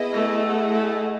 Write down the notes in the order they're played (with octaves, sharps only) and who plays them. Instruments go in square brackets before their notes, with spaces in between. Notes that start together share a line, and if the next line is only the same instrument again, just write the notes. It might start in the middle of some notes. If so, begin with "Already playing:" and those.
Already playing: [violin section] B3 E4 G#4 D#5
[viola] A3
[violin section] E4 G#4 D#5 F#5
[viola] A3